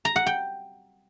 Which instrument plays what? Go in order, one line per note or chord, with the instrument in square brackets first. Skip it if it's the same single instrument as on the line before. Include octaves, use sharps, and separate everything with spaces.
[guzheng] A#5
F#5
G5